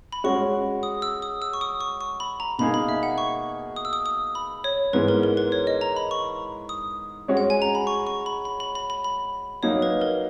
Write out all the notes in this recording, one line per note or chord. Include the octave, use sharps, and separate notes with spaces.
B5
G#3 C#4 F#4 C#6
D#6
E6
D#6
E6
C#6
D#6
C#6
C#6
B5
A#5
B2 A#3 D#4 G#4 B5
B5
E5
F#5
C#6
D#6
E6
D#6
D#6
B5
C#5
G#2 E3 G#3 B3 B4
A#4
A#4
B4
C#5
D#5
A#5
B5
C#6
D#6
G#3 C#4 F#4 C#5
F#5
G#5
A#5
B5
C#6
C#6
B5
B5
B5
B5
B5
B5
F#3 A#3 D#4 C#5
B4
A#4